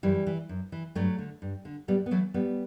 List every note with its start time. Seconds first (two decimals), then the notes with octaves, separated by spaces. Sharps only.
0.03 F#2 E3 G3
0.27 E3
0.49 F#2
0.72 E3
0.95 G2 F#3 A3
1.18 D3
1.42 G2
1.65 D3
1.88 A2 G3 B3
2.06 B3
2.11 E3 F#3 A3
2.34 A2 G3 B3